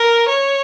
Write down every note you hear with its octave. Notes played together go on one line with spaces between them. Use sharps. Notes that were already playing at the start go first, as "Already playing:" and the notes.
Already playing: A#4
C#5